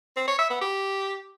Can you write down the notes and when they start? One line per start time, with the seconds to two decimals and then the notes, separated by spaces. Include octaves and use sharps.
0.16 C4
0.28 C#5
0.39 E5
0.50 B3
0.61 G4